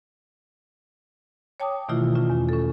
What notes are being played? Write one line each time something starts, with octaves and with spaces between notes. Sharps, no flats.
C#5 G5 A5 D6 D#6
B2 D#3 E3 A3 E4 F4
C#4 F4
E2
C#4 A4